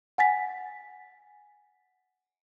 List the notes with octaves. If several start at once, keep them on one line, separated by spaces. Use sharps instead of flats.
F#5 G#5 A6 B6